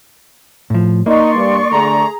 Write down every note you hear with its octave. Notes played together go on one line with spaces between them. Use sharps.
A2 F3
A#3 D#4 D5 C6 C#6
G2
D3 A3 G#4 A#5